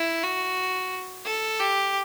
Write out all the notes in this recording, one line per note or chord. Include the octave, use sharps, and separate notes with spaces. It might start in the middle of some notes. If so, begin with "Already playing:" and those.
Already playing: E4
F#4
A4
G4